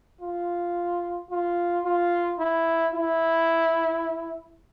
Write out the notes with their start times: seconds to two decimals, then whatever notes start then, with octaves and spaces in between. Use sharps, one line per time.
0.21 F4
1.31 F4
1.85 F4
2.39 E4
2.94 E4